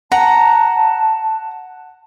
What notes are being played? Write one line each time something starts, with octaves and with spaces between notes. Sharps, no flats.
F#5 A5 A#5